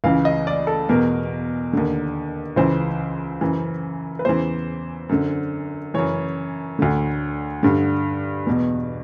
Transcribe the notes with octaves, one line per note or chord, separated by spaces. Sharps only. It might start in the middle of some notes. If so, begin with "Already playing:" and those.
C#2 C#3 E3 F5
D#5
D5
A4
E2 B2 A#4
D#2 D3
C#2 C#3 E3 C5
F#2 C#3 E3
B4
E2 C#3 E3 C5
F#2 D3
F#2 C#3 E3 C#5
D2 D3
G2 D3
E2 B2